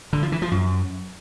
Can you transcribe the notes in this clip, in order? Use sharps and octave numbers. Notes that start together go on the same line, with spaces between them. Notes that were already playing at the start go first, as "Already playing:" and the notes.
D3
F3
E3
F3
F#2